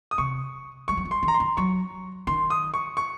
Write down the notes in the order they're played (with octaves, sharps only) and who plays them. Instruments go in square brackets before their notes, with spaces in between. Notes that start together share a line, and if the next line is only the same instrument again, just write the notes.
[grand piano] D#6
[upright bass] C3 [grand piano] C#6
[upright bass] G#3 [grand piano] C#6
[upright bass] F#3
F3
[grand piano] C6
[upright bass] D#3
[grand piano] A#5
C6
[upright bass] D#3
[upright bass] F#3 [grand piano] C#6
[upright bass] D#3 [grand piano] C6
[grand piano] D#6
C#6
C#6